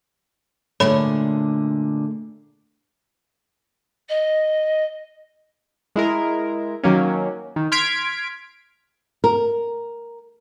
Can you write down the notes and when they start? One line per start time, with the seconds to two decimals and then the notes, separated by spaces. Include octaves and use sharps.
0.80 A#2 D3 G#3 A3 C#5 B5
4.09 D#5
5.96 G#3 E4 A#4
6.83 D#3 F#3 A#3 C#4
7.56 D#3
7.72 C6 F6 G#6 B6 D7
9.24 A#4